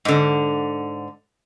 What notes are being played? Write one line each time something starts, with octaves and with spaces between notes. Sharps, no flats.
G#2 D3